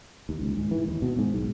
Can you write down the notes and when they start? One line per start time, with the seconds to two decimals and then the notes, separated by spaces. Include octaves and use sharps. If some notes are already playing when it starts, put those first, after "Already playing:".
0.29 D#2
0.42 C#2
0.57 G#2
0.71 E3
0.88 D#2
1.02 B2
1.19 G#2
1.33 B1